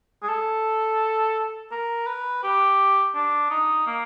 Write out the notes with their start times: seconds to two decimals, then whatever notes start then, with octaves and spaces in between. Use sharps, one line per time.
0.23 G#4
0.29 A4
1.72 A#4
2.07 B4
2.43 G4
3.14 D4
3.50 D#4
3.87 A#3